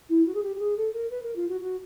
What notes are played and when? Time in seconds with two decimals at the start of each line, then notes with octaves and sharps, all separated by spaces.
0.09 E4
0.26 F#4
0.34 G#4
0.43 G4
0.56 G4
0.59 G#4
0.77 A4
0.94 A#4
1.10 B4
1.23 A#4
1.36 F4
1.48 F#4
1.61 F#4